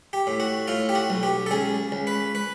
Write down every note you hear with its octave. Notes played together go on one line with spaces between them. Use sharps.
G4
A2
F#4
A2 F4
G4
F#4
B1
G4
A4
C#2 G#4
C#2
B4
B4